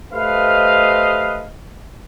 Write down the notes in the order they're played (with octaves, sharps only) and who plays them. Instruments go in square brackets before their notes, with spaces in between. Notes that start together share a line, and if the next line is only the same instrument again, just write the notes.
[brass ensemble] A3 G4 B4 C5 D#5 F5